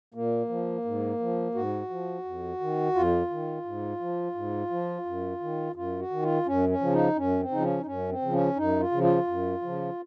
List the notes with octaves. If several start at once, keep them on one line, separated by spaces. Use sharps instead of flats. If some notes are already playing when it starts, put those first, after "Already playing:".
A#2 A#3
F3
G#2
F3
G#2 F#4
F3
F2
D#3
F2 F4
D#3
G#2
F3
G#2
F3
F#2
D#3
F#2 F4
F#4
D#3
F4
F#2 C#4
C#4
C#3 F3
D#4
F#2 C#4
C4
C#3 F3 D#4
C#4
D#4
F#2 C#4
C4
C#3 F3
C#4
F#2 D#4
F4
C#3 F3
F4
F#2
C#3 F3